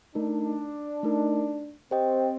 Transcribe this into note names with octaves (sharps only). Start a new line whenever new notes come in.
A3 D4 D#4 A#4
A3 D#4 A#4
C4 G4 C5 D#5 G5